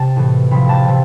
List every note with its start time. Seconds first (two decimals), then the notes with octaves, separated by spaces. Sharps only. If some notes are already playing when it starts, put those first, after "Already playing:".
Already playing: C3 A5
0.16 A2 E3
0.51 C3 F3 B5
0.69 A5
0.87 C3 E3